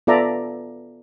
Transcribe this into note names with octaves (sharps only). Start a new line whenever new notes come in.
B3 F4 A4 D5 E5 A#5